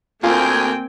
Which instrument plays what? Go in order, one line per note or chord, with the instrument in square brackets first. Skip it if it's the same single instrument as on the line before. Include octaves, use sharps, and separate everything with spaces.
[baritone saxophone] D2 [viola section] A#3 C4 G5 [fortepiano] F4 [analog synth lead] G#5